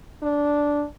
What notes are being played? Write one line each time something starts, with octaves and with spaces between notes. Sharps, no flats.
D4